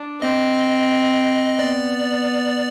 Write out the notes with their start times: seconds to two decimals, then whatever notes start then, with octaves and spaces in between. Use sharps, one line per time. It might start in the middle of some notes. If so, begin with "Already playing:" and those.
Already playing: D4
0.22 C4 D#5
1.58 B3 D5